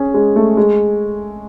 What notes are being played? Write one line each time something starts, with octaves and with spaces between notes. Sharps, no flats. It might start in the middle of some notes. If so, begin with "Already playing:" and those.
Already playing: C#4 G#4
G#3
A3
G#3